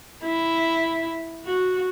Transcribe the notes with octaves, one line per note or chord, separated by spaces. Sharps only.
E4
F#4